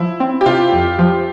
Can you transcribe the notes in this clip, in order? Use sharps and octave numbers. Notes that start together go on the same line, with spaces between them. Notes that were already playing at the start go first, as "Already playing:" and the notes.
Already playing: F3 E4
C4
G4
C3 F4
F2
F3